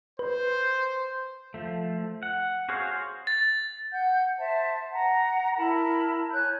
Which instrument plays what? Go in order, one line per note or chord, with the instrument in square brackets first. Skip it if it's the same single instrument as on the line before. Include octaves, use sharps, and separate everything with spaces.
[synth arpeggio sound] B4 [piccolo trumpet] C5
[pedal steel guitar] F3 A3
F#5
F#4 G#4 C5 C#5 F5
[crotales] A6
[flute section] F#5 G6
C5 E5 A5
F#5 A#5
E4 A#4 A5 B5
C#5 G#5 F#6 G6